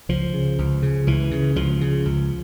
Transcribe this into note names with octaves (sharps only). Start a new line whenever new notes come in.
C#2 F3
C#3
C#2
C#3
C#2 E3
C#3
C#2 F3
C#3
C#2